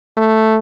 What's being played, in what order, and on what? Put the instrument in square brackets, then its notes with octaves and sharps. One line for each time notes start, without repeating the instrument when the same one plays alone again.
[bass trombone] A3